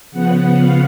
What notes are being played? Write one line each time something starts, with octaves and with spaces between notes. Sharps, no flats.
C#3 F3 B3 F#5
F5